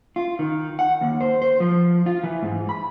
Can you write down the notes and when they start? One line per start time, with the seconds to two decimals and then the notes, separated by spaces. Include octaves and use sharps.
0.16 F4
0.39 D#3
0.79 F#5
1.01 D#2
1.21 C5
1.42 C5
1.60 F3
2.06 F4
2.23 E3
2.43 G#2
2.69 B5